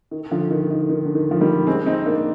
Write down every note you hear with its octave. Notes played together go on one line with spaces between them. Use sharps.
D#3
D3 F3
D#3
D#3
D#3
D3
D#3
F3
D#3 G3
G#3 C4
C4 D#4
A#3 D4